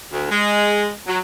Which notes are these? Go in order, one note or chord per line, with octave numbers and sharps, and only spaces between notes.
D2
G#3
F#3